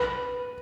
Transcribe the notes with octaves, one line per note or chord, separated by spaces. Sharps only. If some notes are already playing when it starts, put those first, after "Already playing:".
Already playing: B4